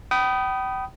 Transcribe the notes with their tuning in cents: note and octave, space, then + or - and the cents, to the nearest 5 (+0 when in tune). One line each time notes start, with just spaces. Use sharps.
G5 -35 B5 +0 D#6 +0